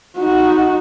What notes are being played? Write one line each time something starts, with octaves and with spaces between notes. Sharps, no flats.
D#4 F#4